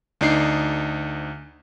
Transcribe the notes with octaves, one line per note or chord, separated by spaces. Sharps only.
D2 D4 D#4 C7